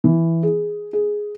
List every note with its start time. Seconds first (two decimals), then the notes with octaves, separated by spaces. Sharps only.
0.04 E3
0.43 G#4
0.93 G#4